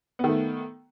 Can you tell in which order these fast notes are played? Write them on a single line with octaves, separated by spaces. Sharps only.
B3 D#3 A3